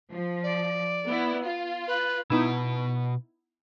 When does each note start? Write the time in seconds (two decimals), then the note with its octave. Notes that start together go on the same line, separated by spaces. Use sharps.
0.10 F3
0.43 D5
1.07 B3 E4
1.44 F4
1.87 B4
2.30 B2 B3 D#4 E4 B4